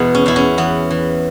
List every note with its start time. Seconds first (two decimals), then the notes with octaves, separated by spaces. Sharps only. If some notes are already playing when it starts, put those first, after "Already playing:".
Already playing: E2 B2 G#3 B3 E4
0.15 C#4
0.26 E2 E4
0.36 C#4
0.58 E3 B3
0.90 E3